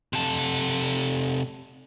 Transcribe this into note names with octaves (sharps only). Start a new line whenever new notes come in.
C3 A4